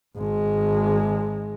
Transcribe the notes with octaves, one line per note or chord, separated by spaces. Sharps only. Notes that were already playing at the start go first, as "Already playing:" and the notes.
G#1 G#3